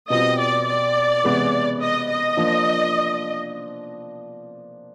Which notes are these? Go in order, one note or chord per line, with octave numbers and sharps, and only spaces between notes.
B2 G3 C4 F4 D#5
D5
D5
C3 E3 G#3 B3 E4
D#5
D#5
F3 A#3 D4